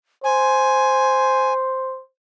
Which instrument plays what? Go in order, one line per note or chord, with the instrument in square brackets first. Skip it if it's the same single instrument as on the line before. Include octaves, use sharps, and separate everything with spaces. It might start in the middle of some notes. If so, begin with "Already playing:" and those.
[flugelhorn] C5 [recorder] G#5